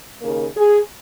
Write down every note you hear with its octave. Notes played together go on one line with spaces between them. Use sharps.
D#2 C#3 A#3 A#4
G#4